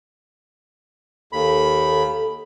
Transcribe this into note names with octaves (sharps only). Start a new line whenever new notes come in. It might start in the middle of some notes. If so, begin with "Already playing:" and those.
D#2 A4 B5